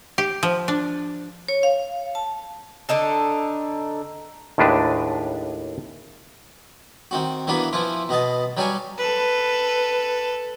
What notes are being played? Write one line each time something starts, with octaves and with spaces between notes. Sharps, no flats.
G4
F3
D4
C#5
F5
A5
D3 D4 D#4 A4
D#2 A2 G#3 D4 B4
D#3 C4 F#4
E3 A#3 B3 D4 F#4 B4
E3 F3 E4 F4
B2 B3 D#5 A5
F#3 G3 F5 G#5 A5 C#6
A4 B4